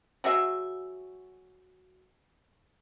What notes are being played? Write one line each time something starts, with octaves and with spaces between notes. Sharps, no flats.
F#3 F#4 G#4 E5